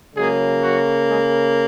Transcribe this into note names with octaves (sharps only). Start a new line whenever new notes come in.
C#3 F#3 G#3 A#3 G#4
F#3 F#4
G#3 G#4